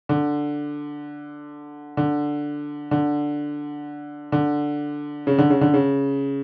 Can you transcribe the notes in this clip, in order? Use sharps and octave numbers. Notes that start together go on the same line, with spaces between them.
D3
D3
D3
D3
C#3
D3
C#3
D3
C#3